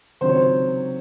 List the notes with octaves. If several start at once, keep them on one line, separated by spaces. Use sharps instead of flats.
C#2 C3 D#3 F#3 C4 C5
C#5
C5